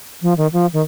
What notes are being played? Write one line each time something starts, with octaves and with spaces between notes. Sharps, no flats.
F3
D#3
F3
D#3